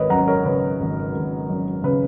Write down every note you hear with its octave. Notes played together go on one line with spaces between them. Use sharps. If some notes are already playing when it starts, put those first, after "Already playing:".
Already playing: G#1 A#4 B4 C#5 D#5
F#2 F#5 A#5
A#4 C#5
C#3 B4
G#1
G#1
F#2
C#3 B4